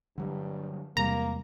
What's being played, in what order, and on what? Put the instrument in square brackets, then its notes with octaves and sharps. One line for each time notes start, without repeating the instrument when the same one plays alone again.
[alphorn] G2 [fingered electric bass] D3 F#3 G3
[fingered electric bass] E2 [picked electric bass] C3 G3 G#3 [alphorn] A#3 [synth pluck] A#5